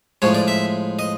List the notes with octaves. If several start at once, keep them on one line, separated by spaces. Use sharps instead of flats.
A2 F3 G#3 C#5
D5
E5
D#5